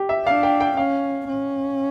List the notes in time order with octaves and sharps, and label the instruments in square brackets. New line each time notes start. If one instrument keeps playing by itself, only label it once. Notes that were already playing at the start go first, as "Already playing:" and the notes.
Already playing: [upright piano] G4
E5
[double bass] D4 [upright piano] F5
[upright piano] G5
G5
[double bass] C#4 [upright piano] F5
[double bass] C#4